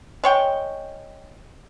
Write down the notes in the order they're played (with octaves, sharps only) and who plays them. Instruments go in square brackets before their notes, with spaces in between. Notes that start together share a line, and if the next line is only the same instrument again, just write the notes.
[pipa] G#3 C#5 G5